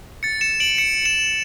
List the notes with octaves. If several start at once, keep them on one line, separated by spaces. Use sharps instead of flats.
A6 C#7
C#7 E7
D7 F#7
C#7 E7
C#7 E7